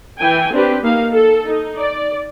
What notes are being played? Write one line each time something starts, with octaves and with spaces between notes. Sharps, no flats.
E3 G5 G#5
C4 D4 G4 B4
A#3 D#4 F5
A4
D#4
D5